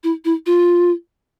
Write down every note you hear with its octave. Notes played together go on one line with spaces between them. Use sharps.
E4
E4
F4